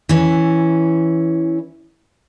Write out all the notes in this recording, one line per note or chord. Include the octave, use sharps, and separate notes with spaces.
E3 C#4